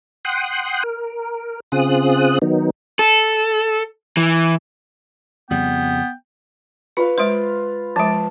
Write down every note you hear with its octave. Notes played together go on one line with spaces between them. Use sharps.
F#5 G5 C6 D#6 F#6
A#4
C#3 C4 F4 G#4 D#6 F#6
D#3 F#3 B3 D#4
A4
E3
F2 C#3 G3 B3 G5
F4 B4 F5
G#3 F4 C5
F3 G#3 A5